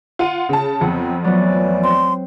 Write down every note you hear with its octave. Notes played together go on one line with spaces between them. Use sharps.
F4 F#5 D#7
C#3 A5
F2 F#3 B3 C4 F#5
E3 F#3 A3 B3 D5
C4 C6